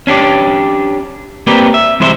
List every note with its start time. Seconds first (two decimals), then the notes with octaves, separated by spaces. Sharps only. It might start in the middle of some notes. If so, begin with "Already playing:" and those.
0.07 C#4 D4 G4 D5
1.47 A#3 C4 G4 B4 D5
1.74 E5
2.00 C2 E3 G#3 C5 E5